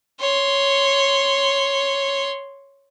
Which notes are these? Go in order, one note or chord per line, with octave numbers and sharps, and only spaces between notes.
C#5 C6